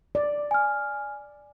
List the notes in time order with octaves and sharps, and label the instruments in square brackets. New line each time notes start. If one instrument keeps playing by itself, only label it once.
[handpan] D5
[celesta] G#5 F6